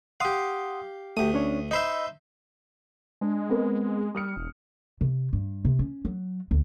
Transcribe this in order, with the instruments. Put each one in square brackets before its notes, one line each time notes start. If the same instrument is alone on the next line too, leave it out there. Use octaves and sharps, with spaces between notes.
[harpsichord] G4 F5 [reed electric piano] F#5 C6 D#6
[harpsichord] D2 D#6 [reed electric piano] A3 G4
[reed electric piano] C#4 D4 C#5
[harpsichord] D#4 C5 E5 [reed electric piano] D#5 B5 E6
[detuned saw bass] G#3 [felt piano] D4
[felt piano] B3 C4 A#4
[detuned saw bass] G3 [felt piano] D#6 F6 C#7
[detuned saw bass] E1
[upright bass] C3
G2
C3
C#4
F#3
D2